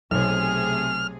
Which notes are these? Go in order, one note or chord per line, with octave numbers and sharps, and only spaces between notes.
B1 C3 A3 G#4 C#5 F6